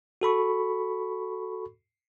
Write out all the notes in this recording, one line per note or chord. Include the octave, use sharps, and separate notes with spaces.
F#4 A4 B5 C#6